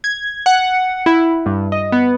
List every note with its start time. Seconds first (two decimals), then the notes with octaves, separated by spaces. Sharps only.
0.04 G#6
0.46 F#5
1.06 E4
1.46 G2
1.72 D#5
1.92 B3